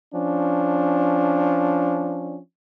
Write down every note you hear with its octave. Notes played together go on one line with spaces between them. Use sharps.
F3 C#4 D4